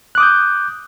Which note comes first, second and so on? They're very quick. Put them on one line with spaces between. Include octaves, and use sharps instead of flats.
F#6 D6 D#6 G6